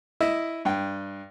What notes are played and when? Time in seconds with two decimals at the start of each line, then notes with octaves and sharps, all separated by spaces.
0.20 E4 D#5 E5
0.65 G2 G5